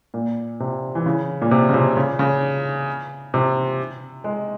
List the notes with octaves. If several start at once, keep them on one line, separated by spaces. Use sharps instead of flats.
A#2
C3
E3
C#3
A#2
C3
C#3
C3
C#3
C#3
C3
G#3